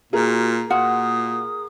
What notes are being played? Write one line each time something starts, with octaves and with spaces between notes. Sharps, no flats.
A#2 F#4 G#4 A#4
A#2 F4 F#4 F#5 D#6